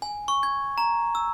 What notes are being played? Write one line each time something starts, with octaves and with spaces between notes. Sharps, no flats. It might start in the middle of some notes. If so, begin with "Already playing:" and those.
G#5
C#6
G#6
A#5
E6